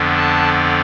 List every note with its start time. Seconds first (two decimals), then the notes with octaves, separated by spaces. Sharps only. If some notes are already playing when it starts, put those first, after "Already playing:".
Already playing: F2 D3 F3 B3 D4
0.16 A5